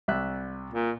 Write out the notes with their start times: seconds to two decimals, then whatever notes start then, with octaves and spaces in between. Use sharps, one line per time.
0.08 C2 E5 F#6
0.72 A#2